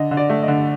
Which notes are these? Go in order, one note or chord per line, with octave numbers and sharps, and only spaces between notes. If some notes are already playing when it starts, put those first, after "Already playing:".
Already playing: D3 D#5
D3
D5
A3
D#5
D3